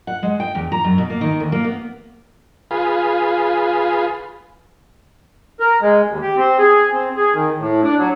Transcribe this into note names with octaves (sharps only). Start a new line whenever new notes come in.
F#5
G#3
G5
E2
A#5
F#2
B2
A#3
D#3
D2
A#3
B3
F4 G#4 B4
A#4
G#3
D#2
G4
C4
G#4
C4
G#4
D#3
A2
D4
F#3